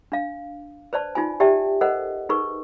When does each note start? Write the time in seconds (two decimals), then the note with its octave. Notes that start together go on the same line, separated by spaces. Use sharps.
0.12 D4 F5
0.93 B4 C5 D5 A5
1.15 D#4 F4 G#5
1.40 G4 D5 E5 G5 A5
1.81 A4 A#4 C5 D#5 F#5
2.29 D#4 G#4 A#4 B4 C#6